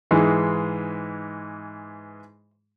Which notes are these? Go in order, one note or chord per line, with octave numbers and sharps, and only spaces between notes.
G#2 E3 G#3